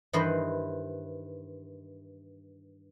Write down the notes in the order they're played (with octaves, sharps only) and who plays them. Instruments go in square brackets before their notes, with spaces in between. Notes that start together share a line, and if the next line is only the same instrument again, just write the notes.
[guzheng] G2 D#3 E3 B4 C5 D#5